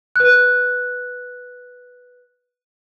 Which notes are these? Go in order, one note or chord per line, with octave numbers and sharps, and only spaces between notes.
B4 F#6